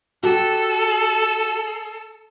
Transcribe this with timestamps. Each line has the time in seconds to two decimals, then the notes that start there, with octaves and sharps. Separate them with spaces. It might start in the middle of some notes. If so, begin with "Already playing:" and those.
0.23 F#4 G4 A4